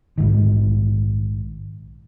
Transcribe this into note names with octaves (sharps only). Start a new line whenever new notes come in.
A#1 G#2 D#3